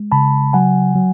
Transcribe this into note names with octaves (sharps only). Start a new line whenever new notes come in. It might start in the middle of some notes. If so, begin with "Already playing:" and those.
Already playing: G#3
C#3 A5 B5
F#3 F#5 G#5
F#3